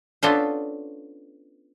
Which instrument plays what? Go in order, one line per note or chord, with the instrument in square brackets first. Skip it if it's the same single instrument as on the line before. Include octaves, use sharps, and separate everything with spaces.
[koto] B3 C#4 D4 F4 A4 C5